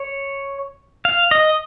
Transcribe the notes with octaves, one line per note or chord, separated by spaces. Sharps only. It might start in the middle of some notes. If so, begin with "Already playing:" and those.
Already playing: C#5
F5
D#5